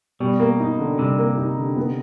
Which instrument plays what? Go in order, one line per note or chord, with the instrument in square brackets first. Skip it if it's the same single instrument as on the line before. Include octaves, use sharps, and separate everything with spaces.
[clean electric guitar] B2 [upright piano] G3
[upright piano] A#3
D#4
D3
[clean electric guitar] C3 [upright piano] G3
[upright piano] A#3
D#4
D3
B3